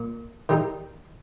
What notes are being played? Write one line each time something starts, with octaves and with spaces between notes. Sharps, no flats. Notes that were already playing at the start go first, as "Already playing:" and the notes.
Already playing: A#2
D#3 G3 D#4